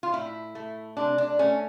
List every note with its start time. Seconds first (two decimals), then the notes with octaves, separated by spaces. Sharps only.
0.03 F4
0.13 A2 E4
0.55 A3
0.97 C3 D4
1.18 D4
1.39 A3 C#4